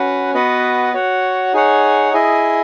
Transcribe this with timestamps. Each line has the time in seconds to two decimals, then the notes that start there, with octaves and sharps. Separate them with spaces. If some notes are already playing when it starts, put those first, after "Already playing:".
Already playing: C#4 F#4 B4 F#5
0.34 B3 F#4 B4 D#5 F#5
0.93 F#4 C#5 F#5
1.53 D#4 G#4 C#5 F#5
2.13 E4 G#4 D#5